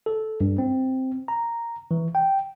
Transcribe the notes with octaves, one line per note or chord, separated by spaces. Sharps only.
A4
G2
C4
A#5
E3
G5